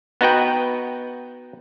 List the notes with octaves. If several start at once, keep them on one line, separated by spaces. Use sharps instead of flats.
B3 D#4 F#4 B4 G5